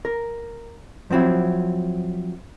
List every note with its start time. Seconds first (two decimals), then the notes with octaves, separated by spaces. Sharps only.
0.05 A#4
1.10 F3 F#3 C4 E4